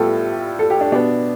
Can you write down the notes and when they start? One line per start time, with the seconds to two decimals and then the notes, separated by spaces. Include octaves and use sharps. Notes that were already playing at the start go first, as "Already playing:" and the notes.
Already playing: A2 G3 B3 F4 G4 A4
0.59 A4
0.70 G4
0.81 D4
0.92 B2 B3 D4